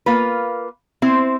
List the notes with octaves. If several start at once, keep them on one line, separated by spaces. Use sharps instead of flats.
A#3 F4 B4
C4 E4 C5